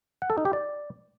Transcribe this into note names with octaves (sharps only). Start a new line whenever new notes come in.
F#5
A4
D#4
G4
D5